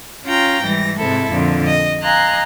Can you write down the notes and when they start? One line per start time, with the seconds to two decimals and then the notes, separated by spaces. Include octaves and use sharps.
0.24 C#4 F4 F5 G5 A#5
0.63 G#2 E3 G3 A#6
0.98 G#2 C3 G#3 E4 A4
1.30 F2 A#2 D3
1.66 D#5
2.02 D#5 F5 G#5 A#5 C6 F#6